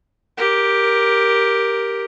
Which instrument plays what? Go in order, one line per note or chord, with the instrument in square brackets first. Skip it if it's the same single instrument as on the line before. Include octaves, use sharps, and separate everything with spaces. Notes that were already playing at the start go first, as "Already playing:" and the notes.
[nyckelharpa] G4 A#4